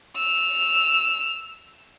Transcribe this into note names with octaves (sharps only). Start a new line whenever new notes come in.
E6 F7